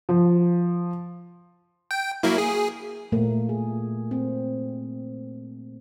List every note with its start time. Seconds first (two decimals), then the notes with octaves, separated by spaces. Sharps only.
0.09 F3
1.91 G5
2.23 F#3 A#3 E4
2.38 G#4
3.12 A#2 A3 A#3
3.49 G#4
4.11 C4